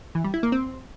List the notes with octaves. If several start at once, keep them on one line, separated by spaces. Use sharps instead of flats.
E3
G3
E4
A#3
C4